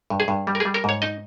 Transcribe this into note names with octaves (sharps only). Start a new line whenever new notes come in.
G2
G#4
G2
G3
A#4
G3 G#4
A#4
G#2 C#5
D#4 D#5